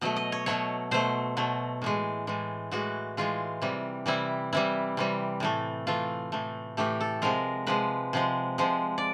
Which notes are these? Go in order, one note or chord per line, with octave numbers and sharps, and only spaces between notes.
B2 F#3 A3 D#5
D#5
C#5
B2 F#3 A3 C#5
B2 F#3 A3 C5
B2 F#3 A3
A2 E3 G#3
A2 E3 G#3
A2 E3 G#3 F#4
A2 E3 G#3 F4
C3 E3 G3
C3 E3 G3 E4
C3 E3 G3 E4
C3 E3 G3
A2 E3 A3
A2 E3 A3 F4
A2 E3 A3
A2 E3 A3 G4
A4
C3 F3 G#3 A#4
C3 F3 G#3 B4
C3 F3 G#3
C3 F3 G#3
D5